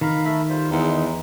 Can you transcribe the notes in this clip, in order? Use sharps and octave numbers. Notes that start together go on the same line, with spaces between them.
D#3 F5 A#5 B5
A3 E5 B5
G3 F4 C5
E2 G#3 D#4